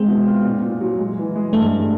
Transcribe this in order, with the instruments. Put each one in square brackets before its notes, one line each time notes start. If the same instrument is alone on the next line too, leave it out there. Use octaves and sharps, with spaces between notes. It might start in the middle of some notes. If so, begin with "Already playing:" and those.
Already playing: [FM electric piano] G#3 [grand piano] C4
[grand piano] B2
F4
A#2
A#2
F#3
G#3
E3
G#3
[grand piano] G2 [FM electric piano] A3
[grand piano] G2